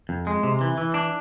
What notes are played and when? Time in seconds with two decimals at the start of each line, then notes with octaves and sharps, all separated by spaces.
0.09 F2
0.27 G#3
0.43 C3
0.61 E3
0.78 E3
0.94 D4